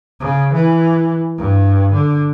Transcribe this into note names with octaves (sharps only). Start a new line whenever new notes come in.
C#3
E3
G2
D3